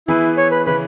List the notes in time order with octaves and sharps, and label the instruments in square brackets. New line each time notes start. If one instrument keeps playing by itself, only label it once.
[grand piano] E3 B3 G#4 B4 [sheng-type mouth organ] E4
[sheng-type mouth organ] C#5
B4
[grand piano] C#3 E3 C#4 [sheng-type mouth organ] B4